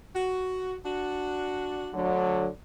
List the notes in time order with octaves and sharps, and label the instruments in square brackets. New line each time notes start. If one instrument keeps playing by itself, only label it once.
[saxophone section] F#4
D4 F#4
[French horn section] D2 D3 F#3